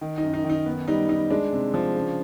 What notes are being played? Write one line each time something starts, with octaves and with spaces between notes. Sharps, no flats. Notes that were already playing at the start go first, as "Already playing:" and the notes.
D#3
D#4
F#2
D#4
D#3
D#4
B3
G3 D#4
G3 D#4
G#3 D4
C3
F3
C#3